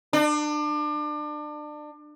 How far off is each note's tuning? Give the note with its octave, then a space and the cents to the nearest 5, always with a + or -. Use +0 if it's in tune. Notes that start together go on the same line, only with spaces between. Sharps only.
D4 +30